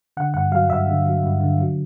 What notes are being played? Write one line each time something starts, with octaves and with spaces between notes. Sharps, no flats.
D3 F#5
G2 F#5
F#3 F5
G2 E5
D3
F#3
G2
D3
F#3